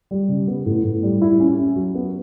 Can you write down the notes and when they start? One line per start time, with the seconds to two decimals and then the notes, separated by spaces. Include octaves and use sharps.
0.11 G3
0.29 C#3
0.47 B3
0.66 A2
0.84 A2
1.03 G3
1.22 E4
1.40 C#4
1.58 C#4
1.76 F#3
1.95 B3